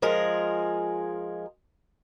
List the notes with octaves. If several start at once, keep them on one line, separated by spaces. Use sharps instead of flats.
F3 G#3 G#4 A#4